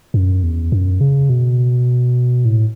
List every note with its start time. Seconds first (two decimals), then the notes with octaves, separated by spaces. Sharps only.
0.14 F#2
0.43 E2
0.72 F#2
1.01 C#3
1.30 B2
2.45 A2